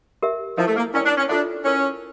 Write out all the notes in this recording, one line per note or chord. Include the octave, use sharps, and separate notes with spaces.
G4 A#4 E5
F3 E4 A#4 E5 A5
A3
A#3
C#4 E4 A#4 D5 G5
D4
C#4
D4 F4 A4 E5
C#4 E4 A#4 C#5